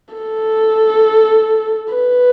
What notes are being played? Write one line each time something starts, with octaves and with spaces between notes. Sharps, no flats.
A4
B4